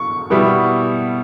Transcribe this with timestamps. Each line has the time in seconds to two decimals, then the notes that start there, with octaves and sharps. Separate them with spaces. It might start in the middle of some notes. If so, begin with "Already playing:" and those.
Already playing: C#6
0.30 B2 G3 B3 E4